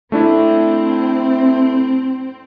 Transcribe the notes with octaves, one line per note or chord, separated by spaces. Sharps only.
A3 C4 D4 E4